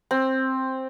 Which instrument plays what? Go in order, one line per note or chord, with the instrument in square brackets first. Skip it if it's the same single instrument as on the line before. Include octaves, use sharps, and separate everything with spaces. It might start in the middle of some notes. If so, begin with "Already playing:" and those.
[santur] C4